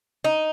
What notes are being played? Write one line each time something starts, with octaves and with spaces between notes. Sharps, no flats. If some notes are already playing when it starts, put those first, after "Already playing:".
D#4